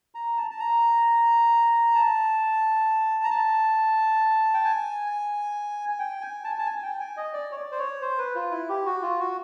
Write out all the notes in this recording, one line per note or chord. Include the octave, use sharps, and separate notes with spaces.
A#5
A5
A5
A#5
A5
A#5
A5
G5
G#5
G#5
G5
G#5
A5
G#5
A5
G#5
G#5
G5
G#5
D#5
D5
C#5
D5
C5
C#5
C5
B4
F4
E4
G4
F#4
F4
F#4